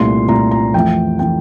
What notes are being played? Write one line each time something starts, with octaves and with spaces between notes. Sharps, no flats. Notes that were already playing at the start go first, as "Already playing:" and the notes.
Already playing: C2 A#2 A3 C6
C2 A#2 A3 A#5
A#5
F2 E3 A3 G5
E3 A3 G5